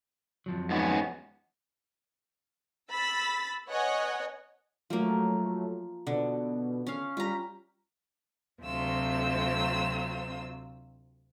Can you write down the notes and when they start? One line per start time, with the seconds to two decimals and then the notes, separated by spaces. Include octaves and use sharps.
0.46 F2 F3 F#3
0.70 G#2 B3 C#4
2.91 B5 E6 A6 B6
3.69 B4 C#5 D#5 F#5 G#5
4.90 F3 F#3 A3 A#3
6.07 B2 D3
6.87 C#4 F5
7.17 G3 F4 A#5 B6
8.62 D2 C3 F#3 C4 F4 E6